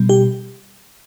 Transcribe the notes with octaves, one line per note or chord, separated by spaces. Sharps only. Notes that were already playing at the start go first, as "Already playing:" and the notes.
Already playing: B2 G3
G4